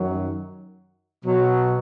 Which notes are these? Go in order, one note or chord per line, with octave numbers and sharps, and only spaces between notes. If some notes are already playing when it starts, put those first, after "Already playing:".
Already playing: F#2 D#3 F#3
B2 F#3